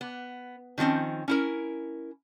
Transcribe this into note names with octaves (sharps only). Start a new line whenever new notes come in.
B3
D#3 F3 F#3 C4 C#4
C#4 E4 A#4